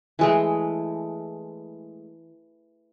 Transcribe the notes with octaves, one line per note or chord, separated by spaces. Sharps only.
E3 G#3 A3